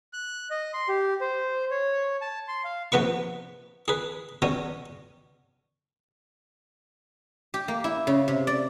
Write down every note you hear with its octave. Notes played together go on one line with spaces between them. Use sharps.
F#6
D#5
C6
G4
C5
C#5
A5
C6
F5
A#1 C3 B3 B4 C#6
G#4 B4
B2 G3 C#4 G#5
G4
A#3
E4
C#3
C3
D5